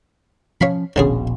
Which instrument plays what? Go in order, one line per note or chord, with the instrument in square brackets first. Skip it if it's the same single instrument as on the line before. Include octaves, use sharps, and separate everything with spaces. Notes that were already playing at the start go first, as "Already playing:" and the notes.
[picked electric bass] F3 C#4 [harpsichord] C#5 F5 B5
[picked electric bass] D#1 A#1 B2 [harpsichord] D3 C#4 G#4